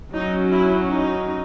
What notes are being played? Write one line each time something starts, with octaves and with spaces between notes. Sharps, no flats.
F#3 C#4 D#4
E4
D#4